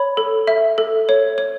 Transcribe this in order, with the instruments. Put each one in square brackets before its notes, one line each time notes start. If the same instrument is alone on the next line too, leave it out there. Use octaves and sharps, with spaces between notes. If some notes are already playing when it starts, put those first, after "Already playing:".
Already playing: [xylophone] C#5 B5
A4
E5
A4
C#5
C#5